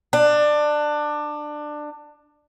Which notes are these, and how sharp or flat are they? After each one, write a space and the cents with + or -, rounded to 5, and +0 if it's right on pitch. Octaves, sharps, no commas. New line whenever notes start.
D4 +20